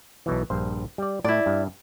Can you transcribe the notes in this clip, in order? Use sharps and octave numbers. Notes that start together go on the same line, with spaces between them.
B1 B2 E3
A#1 G2 C5
G3 D5
A2 E4 D5
G2